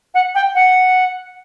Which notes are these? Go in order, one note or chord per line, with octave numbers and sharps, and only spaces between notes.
F#5
G5
F#5